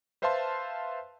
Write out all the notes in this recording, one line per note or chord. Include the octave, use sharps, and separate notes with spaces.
B4 C5 E5 F5 A5 C6